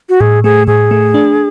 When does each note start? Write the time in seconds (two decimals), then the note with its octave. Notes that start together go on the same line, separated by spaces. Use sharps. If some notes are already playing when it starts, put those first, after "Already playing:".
0.09 F#4
0.21 A2 G#4
0.44 A3 G#4
0.67 A2 G#4
0.91 A3
1.14 D4